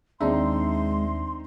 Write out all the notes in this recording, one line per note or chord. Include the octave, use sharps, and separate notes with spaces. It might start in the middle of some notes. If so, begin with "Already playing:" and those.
D#2 G#3 C4 D4 D#4 E5 C6